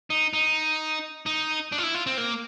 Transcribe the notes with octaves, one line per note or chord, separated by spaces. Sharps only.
D#4
D#4
D#4
D4
F4
E4
F4
C4
A#3